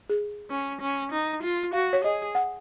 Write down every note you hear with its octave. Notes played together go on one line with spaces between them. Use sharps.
G#4
C#4
C#4
D#4
F4
F#4 F5
C#5
G#4 D#5
F#5